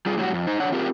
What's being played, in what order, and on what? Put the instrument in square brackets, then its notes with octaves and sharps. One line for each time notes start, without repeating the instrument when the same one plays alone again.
[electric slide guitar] G3 F4 G#4
A2 F#3 G3 F#4
F2
D#4 C5
D3 D4 C#5 F#5
C4 F4 G4 A#4